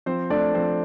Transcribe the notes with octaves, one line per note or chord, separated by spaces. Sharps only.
F3 C4 C5
A3 D4 D5
F3 C4 C5